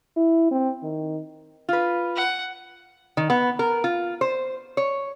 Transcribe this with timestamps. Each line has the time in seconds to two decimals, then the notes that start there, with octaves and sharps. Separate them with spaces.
0.17 E4
0.51 C4
0.83 D#3
1.69 F4 B4
2.16 F#5
3.17 D#3
3.30 B3
3.59 A#4
3.84 F4
4.21 C5
4.77 C#5